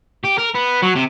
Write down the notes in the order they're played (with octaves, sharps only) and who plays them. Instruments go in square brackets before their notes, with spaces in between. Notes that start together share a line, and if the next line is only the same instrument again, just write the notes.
[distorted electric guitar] G4
A#4
B3
F#3
C3